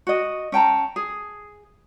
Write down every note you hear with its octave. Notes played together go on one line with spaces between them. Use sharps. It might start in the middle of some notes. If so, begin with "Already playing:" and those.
F#4 D#5
C#4 G5 A5 A#5
G#4